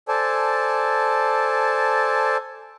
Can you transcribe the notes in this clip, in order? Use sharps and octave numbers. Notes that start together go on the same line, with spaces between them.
A4 C5 D5 G#5 A5